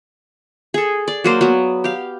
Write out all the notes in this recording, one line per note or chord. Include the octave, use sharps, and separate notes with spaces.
G#4 A4
D5
F#3 A#3 C5
F#3 B3
G4 F5